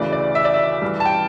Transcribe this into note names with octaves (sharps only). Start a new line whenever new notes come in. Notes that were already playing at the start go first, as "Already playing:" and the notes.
Already playing: D2 C#3 E3 D5
D5
E5
D5
E5
G2 E3
A5
G5